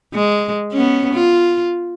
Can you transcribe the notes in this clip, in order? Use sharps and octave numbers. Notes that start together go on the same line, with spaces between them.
G#3
B3 C#4
F4